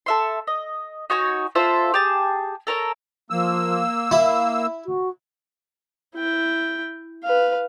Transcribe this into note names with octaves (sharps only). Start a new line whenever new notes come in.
A4 E5 C6
D#5
D#4 F#4 C#5 G#5
F4 A4 C5 E5
G4 G#4 A5
A4 A#4 C#5 A#5
F3 A#3 E6
E4 F5
F#4
E4 G5
B4 F5